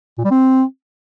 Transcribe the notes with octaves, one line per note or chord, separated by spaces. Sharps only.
A#2
G3
C4